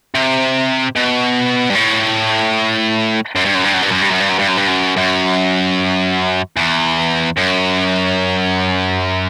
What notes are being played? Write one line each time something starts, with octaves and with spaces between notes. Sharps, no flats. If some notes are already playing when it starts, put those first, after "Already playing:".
C3
B2
G2
A2
F#2
G2
F#2
G2
F#2
G2
F#2
G2
F#2
G2
F#2
G2
F#2
G2
F#2
F#2
E2
F#2